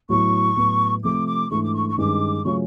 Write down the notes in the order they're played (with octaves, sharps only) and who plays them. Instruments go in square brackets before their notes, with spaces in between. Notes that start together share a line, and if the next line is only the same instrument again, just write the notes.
[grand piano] A2 F#3 B3 E4 [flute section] C#6
[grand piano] A2 F#3 B3
[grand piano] C3 F3 A3 [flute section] D6
[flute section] D6
[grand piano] G#2 E3 A3 D4 [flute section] C#6
[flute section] D6
C#6
C#6
[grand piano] G2 D#3 G#3 C#4 [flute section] D6
[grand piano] C#3 F#3 A3 C#4 F4 [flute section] C#6